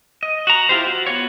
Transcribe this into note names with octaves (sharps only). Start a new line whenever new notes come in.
D#5
F#4 A#5
E4 F4 G4 C5
F#4
B3 F4 F#4 C#5